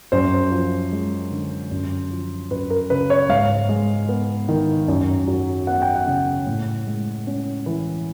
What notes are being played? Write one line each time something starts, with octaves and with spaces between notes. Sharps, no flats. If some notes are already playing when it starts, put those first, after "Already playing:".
F#2 C5
F3
G#3
D3
F#2
F3
F#2 B4
A#4
C#3 B4
C#5
G#2 F5
G#3
B3
D#3
F#2
F#3
B3 F#5
G5
F#5
C#3
A2
G#3
C#4
E3